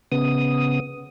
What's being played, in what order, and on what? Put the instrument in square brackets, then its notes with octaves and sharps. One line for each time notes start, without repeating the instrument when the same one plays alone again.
[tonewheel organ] C#3 B3 D#6